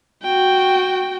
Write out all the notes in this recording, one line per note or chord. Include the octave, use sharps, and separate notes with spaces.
F#4 G5